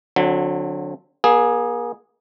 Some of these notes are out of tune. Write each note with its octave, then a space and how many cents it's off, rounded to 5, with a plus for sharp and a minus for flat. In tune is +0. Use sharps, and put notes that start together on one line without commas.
D3 +0 F#3 -30 C4 +0
A#3 +40 G#4 +0